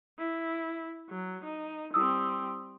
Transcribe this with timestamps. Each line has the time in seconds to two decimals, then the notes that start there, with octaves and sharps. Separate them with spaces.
0.19 E4
1.10 F#3
1.44 D#4
1.94 G3 C4 E4 D#6 E6